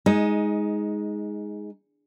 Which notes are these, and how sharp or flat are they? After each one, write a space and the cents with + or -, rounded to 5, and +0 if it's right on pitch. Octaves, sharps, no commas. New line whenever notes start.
G#3 +0 D#4 +20